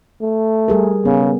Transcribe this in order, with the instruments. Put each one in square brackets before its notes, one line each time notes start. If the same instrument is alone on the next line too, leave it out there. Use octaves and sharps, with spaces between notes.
[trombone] A3
[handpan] G3 G#4 A#4
[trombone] C#3 [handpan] B3